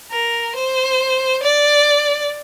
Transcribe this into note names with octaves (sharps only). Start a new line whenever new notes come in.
A#4
C5
D5